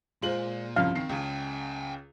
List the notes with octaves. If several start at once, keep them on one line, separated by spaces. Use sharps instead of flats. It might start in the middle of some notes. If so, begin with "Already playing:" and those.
A#2 G#3 F4 C5 F#7
C2 G2 C#3 F3 F5
D#3 C4 C7
C#2 C#3 G5 G#5